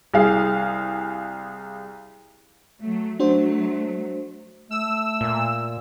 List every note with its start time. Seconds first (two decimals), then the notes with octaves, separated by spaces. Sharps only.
0.14 C2 G#4 F5
2.83 F#3 A3
3.20 F#3 A3 D4 F#4 C5
4.71 A3 E6
5.21 A#2